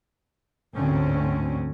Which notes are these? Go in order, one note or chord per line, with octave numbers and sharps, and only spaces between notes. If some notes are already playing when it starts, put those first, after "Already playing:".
A1 D2 G#2 D3 C4 C#4